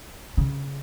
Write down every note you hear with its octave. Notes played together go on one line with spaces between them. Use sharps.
C#3